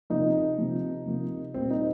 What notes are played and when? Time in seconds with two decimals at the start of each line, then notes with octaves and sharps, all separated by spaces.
0.10 C3 F3 A#3 D#4
0.58 C3 F3 A#3
1.06 C3 F3 A#3
1.54 A#2 G3 A#3 C4
1.70 D#4